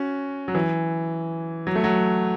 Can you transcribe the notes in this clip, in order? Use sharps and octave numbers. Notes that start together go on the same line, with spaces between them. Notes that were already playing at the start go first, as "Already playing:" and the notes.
Already playing: C#4 F#4
F#3
E3
F#3
A3
F#3